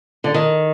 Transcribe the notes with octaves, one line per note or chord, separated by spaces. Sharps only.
D3
D#3